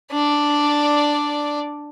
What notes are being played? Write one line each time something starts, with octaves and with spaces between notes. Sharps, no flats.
D4 D5